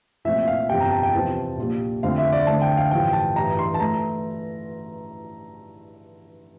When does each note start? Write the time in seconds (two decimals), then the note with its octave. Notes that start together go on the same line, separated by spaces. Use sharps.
0.25 C2 A#2 F3 A3 C4 E5
0.47 F5
0.69 G1 F2 C3 G3 G5
0.80 A#5
0.92 A5
1.03 G5
1.13 E2 C3 F3 C4 A5
1.58 A#1 A#2 G3
2.03 F2 D3 A3 C4 F5
2.18 E5
2.32 D5
2.47 D2 D3 A3 C4 A5
2.62 G5
2.77 F5
2.91 A1 G2 F3 G5
3.13 A5
3.36 A1 G2 E3 A#5
3.59 C6
3.74 A5
3.80 E3 A3 A#5